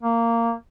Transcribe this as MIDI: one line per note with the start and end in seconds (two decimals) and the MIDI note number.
0.03 0.53 58